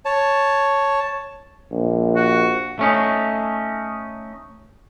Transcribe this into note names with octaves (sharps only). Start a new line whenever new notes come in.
C#5 A5
A#1
F#4
A3 C#4 D#4